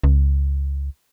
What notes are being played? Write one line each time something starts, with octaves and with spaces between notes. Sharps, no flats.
C#2